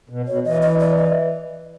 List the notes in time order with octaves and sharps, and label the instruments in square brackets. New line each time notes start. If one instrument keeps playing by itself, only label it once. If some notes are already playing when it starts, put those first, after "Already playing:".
[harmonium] B2
[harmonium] B2 [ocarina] C#5
[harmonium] E3 [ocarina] D#5
[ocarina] D#5
D5
D#5